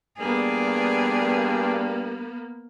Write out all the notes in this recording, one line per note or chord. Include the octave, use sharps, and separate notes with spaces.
G2 A#3 B3 G#4 D5